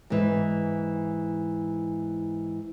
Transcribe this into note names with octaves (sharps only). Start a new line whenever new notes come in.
G#2 E3